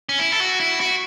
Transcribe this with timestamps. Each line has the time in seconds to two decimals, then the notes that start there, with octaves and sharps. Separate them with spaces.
0.09 C#4
0.19 E4
0.32 A4
0.40 F#4
0.60 E4
0.80 F#4